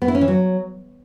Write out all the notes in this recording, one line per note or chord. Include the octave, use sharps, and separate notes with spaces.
B3
E4
C#4
E3
F#3